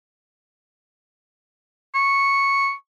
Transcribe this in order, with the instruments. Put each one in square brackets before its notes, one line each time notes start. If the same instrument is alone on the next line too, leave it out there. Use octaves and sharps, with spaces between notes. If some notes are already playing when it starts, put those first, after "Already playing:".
[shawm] C#6